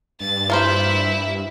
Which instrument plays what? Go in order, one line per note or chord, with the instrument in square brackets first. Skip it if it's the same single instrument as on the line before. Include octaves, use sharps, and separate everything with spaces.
[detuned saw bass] G2 [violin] A6
[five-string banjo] F3 A#3 C5 [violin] E4 E5